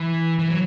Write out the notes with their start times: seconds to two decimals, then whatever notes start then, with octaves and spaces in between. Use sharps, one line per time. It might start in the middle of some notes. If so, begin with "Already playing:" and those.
Already playing: E3
0.39 E3
0.50 F#3